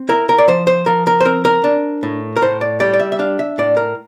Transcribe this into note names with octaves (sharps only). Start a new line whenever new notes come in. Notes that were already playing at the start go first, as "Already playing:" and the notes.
Already playing: C4
E4 A#4
A#4
D5
F3 C5
C5
F3 A#4
A#4
C5
C4 A#4
A#4
D4
A2
A#4
A2 C5
D5
G3 D5
D5
E5
E5
D4 F5
E5
A2 D5
A#4